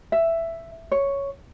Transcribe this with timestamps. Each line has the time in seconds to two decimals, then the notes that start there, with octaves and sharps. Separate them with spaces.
0.12 E5
0.92 C#5